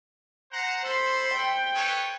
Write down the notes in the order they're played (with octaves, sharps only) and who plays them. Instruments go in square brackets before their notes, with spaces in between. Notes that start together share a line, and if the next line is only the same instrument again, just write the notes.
[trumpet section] C5 F#5 A#5
[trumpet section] A4 B5 C6 [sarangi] C5
[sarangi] G5
[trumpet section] A4 B4 C#5